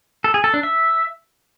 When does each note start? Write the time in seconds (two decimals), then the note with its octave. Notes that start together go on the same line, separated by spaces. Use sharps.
0.24 A4
0.34 G#4
0.44 A4
0.54 D4
0.63 E5